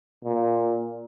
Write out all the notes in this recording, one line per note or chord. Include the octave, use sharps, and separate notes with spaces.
A#2